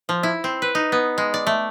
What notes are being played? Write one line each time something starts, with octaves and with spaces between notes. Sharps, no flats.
F3
E4
C4
B4
D#4
B3
G#3
D5
A3